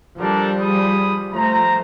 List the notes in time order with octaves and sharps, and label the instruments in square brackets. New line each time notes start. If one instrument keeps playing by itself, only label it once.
[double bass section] F3 G3 [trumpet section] D4 A4 A#4
[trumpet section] G#4 B5 D#6
[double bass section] F3 A3 [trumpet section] C5 A#5